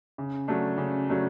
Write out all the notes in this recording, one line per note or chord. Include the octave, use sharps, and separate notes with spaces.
C#3
F#3 A3 D4
C#3
F#3 A3 D4